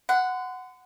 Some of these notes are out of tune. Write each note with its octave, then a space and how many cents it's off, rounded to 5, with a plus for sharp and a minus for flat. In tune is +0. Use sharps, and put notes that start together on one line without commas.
F#5 +0 C6 -40